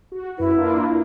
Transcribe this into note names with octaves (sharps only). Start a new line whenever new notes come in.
F#4
F#2 E4 B4
A#3 D4 F4